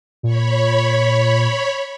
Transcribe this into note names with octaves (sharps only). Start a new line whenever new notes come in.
A#2 C#5 B5